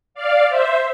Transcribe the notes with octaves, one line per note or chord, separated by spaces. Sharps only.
D5 F5
C5 E5